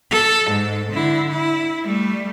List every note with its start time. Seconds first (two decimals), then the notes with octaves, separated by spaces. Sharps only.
0.11 A4
0.50 G#2
0.92 D3 E4
1.31 E4
1.84 G3 A3